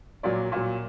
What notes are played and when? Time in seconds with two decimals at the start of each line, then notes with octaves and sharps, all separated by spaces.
0.23 A#2 F#3 D5
0.52 A#2 F#3